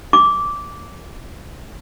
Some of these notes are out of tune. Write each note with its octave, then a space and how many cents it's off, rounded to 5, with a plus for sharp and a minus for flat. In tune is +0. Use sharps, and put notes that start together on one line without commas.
D6 -15